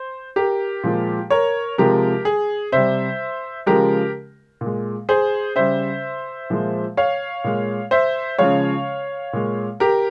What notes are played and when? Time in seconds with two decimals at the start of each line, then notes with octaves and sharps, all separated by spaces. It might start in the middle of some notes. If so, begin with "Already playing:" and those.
Already playing: C5
0.36 G4 A#4
0.84 A#2 F3 G#3
1.31 A#4 C#5
1.78 C3 F3 G#3 G4 A#4
2.25 G#4
2.72 C3 G3 C5 E5
3.66 C#3 F3 G#3 G4 A#4
4.61 A#2
4.66 G#3
5.09 G#4 C5
5.56 C#3 G3 C5 E5
6.50 A#2 F3 G#3
6.97 C#5 F5
7.44 A#2 G#3
7.91 C5 E5
8.39 C#3 F3 G#3 C#5 F5
9.33 A#2 G#3
9.80 G4 A#4